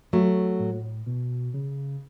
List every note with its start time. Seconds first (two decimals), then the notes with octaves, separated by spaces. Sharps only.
0.13 F#3 A3
0.59 A2
1.06 B2
1.54 C#3